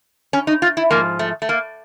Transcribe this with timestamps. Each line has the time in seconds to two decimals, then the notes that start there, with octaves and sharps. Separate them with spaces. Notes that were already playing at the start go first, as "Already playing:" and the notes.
0.33 C#4
0.47 D#4
0.62 F4
0.77 E4
0.91 G#2 F3 A#3
1.19 A3
1.42 A3
1.49 A#3